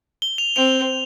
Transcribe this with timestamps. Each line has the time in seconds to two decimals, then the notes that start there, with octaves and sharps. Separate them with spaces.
0.22 G7
0.38 F7
0.56 C4 F7